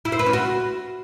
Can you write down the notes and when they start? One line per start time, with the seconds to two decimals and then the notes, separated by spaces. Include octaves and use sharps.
0.05 E4
0.12 C5
0.19 B4
0.26 C#4
0.33 F#4